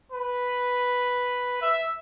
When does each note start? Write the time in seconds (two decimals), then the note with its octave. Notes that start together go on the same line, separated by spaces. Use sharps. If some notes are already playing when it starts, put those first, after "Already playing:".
0.12 B4
1.62 E5